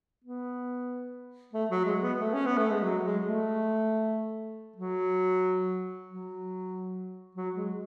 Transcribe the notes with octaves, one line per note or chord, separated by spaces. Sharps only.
B3
A3
F#3
G#3
B3
A3
C#4
B3
A3
G#3
F#3
G#3
A3
F#3
F#3
F#3
G#3